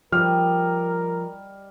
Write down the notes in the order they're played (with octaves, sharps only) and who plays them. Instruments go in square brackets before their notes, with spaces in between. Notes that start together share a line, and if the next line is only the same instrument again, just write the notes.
[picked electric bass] F3 [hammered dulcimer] G3 D#5 [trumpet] A#4 [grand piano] F6